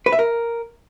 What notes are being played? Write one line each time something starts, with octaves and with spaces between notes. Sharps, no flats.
B4
E5
A#4